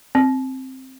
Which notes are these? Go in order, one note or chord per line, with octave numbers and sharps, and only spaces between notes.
C4